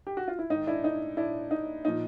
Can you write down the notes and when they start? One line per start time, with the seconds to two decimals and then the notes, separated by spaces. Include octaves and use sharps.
0.07 G4
0.17 F#4
0.28 F4
0.39 E4
0.50 G#2 D#3 D#4
0.67 D4 E4
0.84 D#4
1.17 D4 E4
1.51 D#4
1.85 A#2 F3 D#4